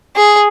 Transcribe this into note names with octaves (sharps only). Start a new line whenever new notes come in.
G#4